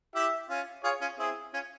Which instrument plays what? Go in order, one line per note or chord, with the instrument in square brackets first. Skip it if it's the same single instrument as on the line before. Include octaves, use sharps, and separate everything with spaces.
[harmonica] E4 G4 [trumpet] E5
[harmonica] C#4 F4
[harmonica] F4 G#4 [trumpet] C#5
[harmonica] C#4 F4
[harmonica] C4 E4 [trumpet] G#4
[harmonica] C#4 F4